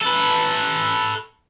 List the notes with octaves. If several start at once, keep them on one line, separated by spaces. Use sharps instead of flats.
A4 B4